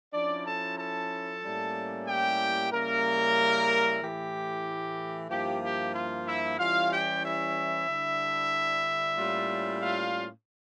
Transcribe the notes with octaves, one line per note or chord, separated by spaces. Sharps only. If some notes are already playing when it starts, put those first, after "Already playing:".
F3 C#4 D4 E4 D5
A4 A5
A4 A5
A2 G3 A#3 C#4 E4
G4 G5
C#3 G3 A#3 C#4 E4 A#4
A2 E3 A3 G4
G2 F3 A#3 E4 G4
G4
F4
E4 E5
E3 G3 C#4 E4 F4 F5
G4 G5
E4 E5
D3 G3 D4
A2 G3 A#3 C#4 F4
F4 F5